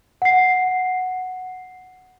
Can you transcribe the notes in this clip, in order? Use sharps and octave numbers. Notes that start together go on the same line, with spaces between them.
F#5 C7